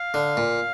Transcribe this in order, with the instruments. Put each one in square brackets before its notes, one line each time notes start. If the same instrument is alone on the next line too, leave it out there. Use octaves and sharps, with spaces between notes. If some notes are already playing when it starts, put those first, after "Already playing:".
Already playing: [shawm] F5
[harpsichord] D3
A#2